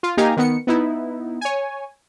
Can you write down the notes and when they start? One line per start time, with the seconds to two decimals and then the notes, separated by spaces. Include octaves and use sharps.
0.03 F4
0.17 A#3 D#4 G4 F5 G#5 A#5
0.37 D#3 B3 C#7
0.67 B3 D#4 E4
1.41 C#5 G#5